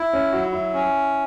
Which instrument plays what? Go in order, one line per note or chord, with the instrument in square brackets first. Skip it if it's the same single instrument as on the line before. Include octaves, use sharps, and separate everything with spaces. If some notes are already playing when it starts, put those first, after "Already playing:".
Already playing: [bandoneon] E4
[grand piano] C#4
[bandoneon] F#3 [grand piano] F#4
[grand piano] E4
[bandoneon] C#4